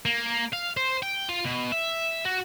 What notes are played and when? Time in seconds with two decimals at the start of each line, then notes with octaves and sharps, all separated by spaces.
0.06 A#3
0.53 F5
0.77 C5
1.03 G5
1.29 F4
1.45 B2
1.72 E5
2.25 F#4